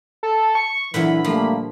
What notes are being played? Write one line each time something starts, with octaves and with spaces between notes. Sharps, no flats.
A4
C#6
A#2 D3 E3 F#3 B5
F3 G3 A3 A#3